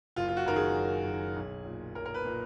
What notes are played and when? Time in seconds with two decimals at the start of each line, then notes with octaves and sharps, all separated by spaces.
0.16 F#1 F4
0.29 F4
0.37 F#4
0.46 F#2 D#3 A#4
0.56 G#4
0.75 F#1
1.05 F#2 D#3
1.36 B1
1.65 A#2
1.95 B1 A#4
2.05 A#4
2.14 B4
2.25 A#2